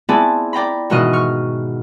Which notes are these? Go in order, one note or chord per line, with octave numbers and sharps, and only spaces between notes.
B3 C4 E4 G#4 D5 A5
D5 G5 A#5 B5
G#2 B2 D#3 E3 D#5 F6
C#6 F6